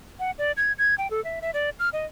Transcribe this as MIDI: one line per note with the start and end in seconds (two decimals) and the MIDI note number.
0.19 0.31 78
0.38 0.52 74
0.57 0.72 92
0.79 0.95 92
0.98 1.10 79
1.10 1.22 69
1.24 1.40 76
1.42 1.51 76
1.54 1.70 74
1.79 1.89 89
1.93 2.06 75